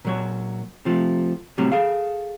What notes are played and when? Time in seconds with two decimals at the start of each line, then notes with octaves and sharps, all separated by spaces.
0.05 A#2 F#3 C#5
0.85 C3 F3 A3
1.58 C2 A2 C3 F#3 G3
1.72 G#4 A4 F5